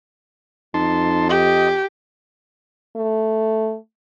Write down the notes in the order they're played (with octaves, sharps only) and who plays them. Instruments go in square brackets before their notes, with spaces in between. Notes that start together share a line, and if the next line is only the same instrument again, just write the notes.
[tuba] F2 [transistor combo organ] D#4 A5 C6
[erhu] G4 [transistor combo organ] D#5
[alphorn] A3